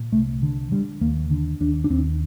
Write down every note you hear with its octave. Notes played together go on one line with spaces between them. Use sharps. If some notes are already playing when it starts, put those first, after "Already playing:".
Already playing: A#2
C2 A3
D3
D3 G3
D#2 A#3
D3
D#2 D4
D4
D#2 C4